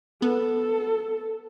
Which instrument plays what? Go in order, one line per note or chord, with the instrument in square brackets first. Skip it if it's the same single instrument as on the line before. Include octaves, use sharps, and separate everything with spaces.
[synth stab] B3 [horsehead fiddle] A4